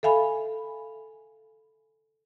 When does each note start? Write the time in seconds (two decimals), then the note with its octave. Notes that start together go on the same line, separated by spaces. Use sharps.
0.03 A4 E5 F5 G#5 B5